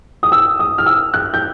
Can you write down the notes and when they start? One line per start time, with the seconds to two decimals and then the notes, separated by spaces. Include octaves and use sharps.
0.23 D#6
0.32 E6
0.59 D#6
0.78 F6
0.86 E6
1.14 F#6
1.34 G6